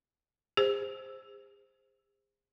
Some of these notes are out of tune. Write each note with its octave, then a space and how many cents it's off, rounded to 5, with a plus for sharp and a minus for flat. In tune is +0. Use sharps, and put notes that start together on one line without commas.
G#4 -40 C5 +0